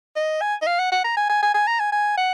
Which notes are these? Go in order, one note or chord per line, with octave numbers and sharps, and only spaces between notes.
D#5
G#5
D#5
F5
F#5
F#5
A#5
G#5
G#5
G#5
G#5
A#5
G#5
G#5
F#5